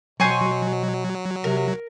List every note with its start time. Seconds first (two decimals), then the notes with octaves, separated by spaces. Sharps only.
0.20 B2 F#3 C5 G#5 C#6
1.44 C3 A#4